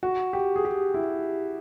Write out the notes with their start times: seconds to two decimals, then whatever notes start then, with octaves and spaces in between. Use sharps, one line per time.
0.03 F#4
0.33 G4
0.56 G#4
0.65 G4
0.94 E4